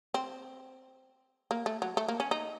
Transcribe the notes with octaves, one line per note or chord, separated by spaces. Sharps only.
C4
A#3
A3
F#3
A3
A#3
C#4
D#4